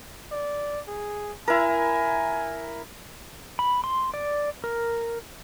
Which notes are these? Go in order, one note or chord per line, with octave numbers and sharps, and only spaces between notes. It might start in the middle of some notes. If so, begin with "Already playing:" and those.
D5
G#4
E4 A#4 G#5
B5
C6
D5
A#4